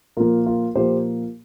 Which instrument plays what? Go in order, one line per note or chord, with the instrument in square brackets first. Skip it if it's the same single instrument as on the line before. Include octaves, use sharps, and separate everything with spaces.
[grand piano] A#2 F3 A#3 F4 A#4
F4 A#4
A#2 F3 A#3 G4 C5